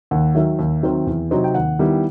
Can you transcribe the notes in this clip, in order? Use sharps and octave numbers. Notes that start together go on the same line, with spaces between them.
D#2 F#5
D#3 F#3 E5
D#2
D#3 F#3 C4
E2
C3 F#3 C4 D#4
G5
D#2 F#5
D#3 G3 B3 E4